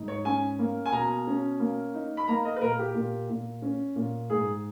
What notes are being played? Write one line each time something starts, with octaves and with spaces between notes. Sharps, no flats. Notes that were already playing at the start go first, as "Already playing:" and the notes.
Already playing: G#2 D#4
C#5
C#4 G#5
A#3
G#5
B2 A#5
C#4
A#3
D#4
B5
A#3 A#5
D#5
B4
A#2 A#4
G4
A#2
A#2
C#4
A#2
G#2 G#4